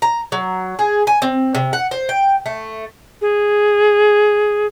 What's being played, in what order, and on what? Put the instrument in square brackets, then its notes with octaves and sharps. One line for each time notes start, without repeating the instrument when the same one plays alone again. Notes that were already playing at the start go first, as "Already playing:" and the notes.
[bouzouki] A#5
F#3
G#4
G#5
C4
C3
F#5
C5
G5
A3
[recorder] G#4